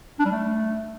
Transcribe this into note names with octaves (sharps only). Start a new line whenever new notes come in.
D4
G3
A3